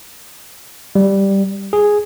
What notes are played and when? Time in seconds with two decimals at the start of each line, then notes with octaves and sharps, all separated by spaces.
0.95 G3
1.73 G#4